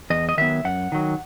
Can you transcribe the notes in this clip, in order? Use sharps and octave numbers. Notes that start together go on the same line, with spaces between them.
E2 D#5
D#5
D#3 F#3 B3 E5
F#2 F#5
D#3 F#3